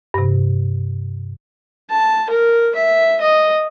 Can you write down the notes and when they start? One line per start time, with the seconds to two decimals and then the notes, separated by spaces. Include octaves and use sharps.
0.14 G2 C3
1.91 A5
2.30 A#4
2.75 E5
3.21 D#5